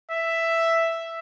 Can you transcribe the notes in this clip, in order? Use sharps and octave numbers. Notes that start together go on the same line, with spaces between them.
E5